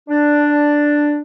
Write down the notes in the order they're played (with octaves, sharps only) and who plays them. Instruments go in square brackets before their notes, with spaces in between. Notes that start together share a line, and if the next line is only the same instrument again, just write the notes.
[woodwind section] D4